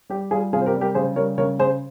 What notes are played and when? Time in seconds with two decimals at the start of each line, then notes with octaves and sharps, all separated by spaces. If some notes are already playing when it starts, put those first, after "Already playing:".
0.10 G3 G4
0.31 G3 F4 G#4
0.53 C3 F4 G#4
0.61 C5
0.66 G4 A#4
0.74 G3
0.81 G4 A#4
0.94 C#3 G#4 C5
1.16 G3 A#4 C#5
1.38 C#3 A#4 C#5
1.59 C#3 G#4 C5